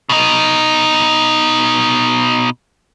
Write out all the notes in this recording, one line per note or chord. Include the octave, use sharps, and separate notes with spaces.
B2 D#4